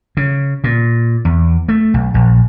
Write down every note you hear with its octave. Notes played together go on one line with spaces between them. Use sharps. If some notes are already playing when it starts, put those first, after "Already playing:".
C#3
A#2
E2
A3
B1
A#1